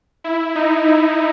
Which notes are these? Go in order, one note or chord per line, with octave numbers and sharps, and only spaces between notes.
E4
D#4
E4